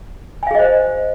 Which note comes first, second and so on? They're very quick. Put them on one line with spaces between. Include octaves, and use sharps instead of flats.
G#5 F5 G#4 D#5 C5